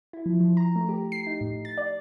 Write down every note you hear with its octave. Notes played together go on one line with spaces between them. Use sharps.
E4
F3
F3
A#5
A3
G4
C7
D#4
A2
A6
D5